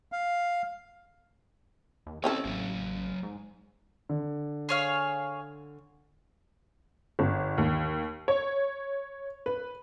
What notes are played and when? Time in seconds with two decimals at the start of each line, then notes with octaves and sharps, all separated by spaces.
0.12 F5
2.06 D#2
2.24 E3 C4 C#4 A4 C#5 D#5
2.45 A1 F#3 A#3
3.23 G#2
4.09 D3
4.69 G#4 C#5 F5
7.19 G1
7.58 D#2
8.28 C#5
9.46 B4